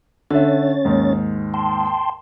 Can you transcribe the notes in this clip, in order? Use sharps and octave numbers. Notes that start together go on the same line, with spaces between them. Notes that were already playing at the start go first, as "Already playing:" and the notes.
D3 C#4 C#5 E5 A6
D#2 G#2
G5 A5 C6